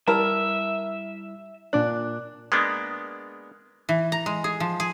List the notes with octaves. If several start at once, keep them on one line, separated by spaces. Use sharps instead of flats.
G3 E4 A#4 E5 A5
A#2 D4 D6 F#6
G#3 A#3 B3 D4
E3
A#5
G#3
G#4
F3
G#4